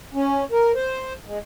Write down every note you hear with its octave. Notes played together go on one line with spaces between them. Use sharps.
C#4
A#4
C5
G#3